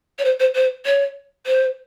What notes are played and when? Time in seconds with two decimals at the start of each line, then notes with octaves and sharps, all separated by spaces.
0.18 C#5
0.24 C5
0.39 C5
0.55 C5
0.85 C#5
1.46 C5